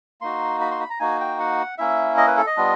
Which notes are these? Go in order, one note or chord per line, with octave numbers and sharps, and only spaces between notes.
A#3 D#4 F#4 C6
B5
C6
B5
A#5
A#3 D#4 F#4 G#5
G5
F#5
A#3 C#4 E4 E5
D#5
B4
A4
D#5
G3 B3 D4 F4